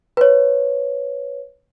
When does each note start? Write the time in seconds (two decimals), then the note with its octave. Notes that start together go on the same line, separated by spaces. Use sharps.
0.17 B4 C#5